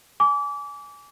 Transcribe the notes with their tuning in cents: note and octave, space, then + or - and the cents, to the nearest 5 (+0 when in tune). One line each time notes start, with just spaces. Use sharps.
G#5 +5 D6 -30